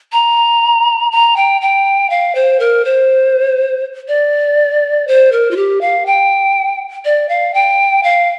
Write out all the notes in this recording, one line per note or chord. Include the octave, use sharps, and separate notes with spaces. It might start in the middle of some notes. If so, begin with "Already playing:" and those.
A#5
A#5
G5
G5
F5
C5
A#4
C5
D5
C5
A#4
F4
G4
F5
G5
D5
F5
G5
F5